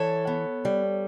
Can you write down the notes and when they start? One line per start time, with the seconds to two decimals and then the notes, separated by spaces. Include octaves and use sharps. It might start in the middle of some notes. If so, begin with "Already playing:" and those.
Already playing: E3 A4 C#5
0.27 B3
0.65 G3